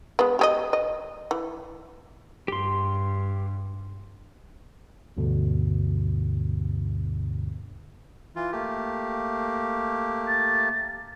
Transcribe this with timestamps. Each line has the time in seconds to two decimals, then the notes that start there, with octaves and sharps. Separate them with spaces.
0.19 G#3 B3
0.39 G4 G#4 D#5
0.73 D#5
1.31 E3
2.48 G2 G4 C6
5.17 D2 G2 B2 D3
8.36 E3 F4
8.52 A3 A#3 G4
10.28 A6